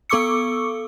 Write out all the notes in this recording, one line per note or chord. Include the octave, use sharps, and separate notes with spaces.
B3 A4 C#6 D6 E6 C#7